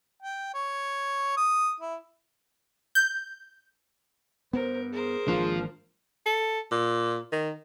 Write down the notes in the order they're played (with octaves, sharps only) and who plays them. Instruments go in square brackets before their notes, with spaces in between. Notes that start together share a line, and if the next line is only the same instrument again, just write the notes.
[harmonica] G5
C#5
D#6
E4
[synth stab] G6
[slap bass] G2 B3 [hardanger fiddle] A#4 [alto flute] C5
[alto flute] G#4 [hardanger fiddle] A#4 C5
[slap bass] G#1 A#3 D4 [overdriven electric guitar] F3
[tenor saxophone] A4
A#2
D#3